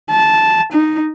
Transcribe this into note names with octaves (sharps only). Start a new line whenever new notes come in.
A5
D#4